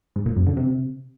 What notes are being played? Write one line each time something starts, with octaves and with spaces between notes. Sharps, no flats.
G#2
A#2
F#2
D3
C3